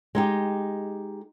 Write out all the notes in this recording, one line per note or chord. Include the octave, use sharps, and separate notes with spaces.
G#3 D#4 G4